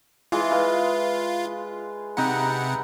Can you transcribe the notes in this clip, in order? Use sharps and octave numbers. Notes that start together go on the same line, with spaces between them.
E3 G#3 F4 C6
B4 F5
C3 D#4 F#5 B5